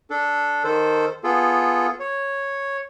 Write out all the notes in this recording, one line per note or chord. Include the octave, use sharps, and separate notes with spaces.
D4 A4
D#3 A4 C5
B3 F4 G#4 A4
C#5